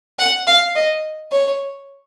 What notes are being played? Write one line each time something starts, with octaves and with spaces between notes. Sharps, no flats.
F#5
F5
D#5
C#5